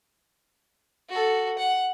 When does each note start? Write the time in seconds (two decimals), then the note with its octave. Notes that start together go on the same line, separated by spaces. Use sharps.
1.09 F#4 A4
1.58 F#5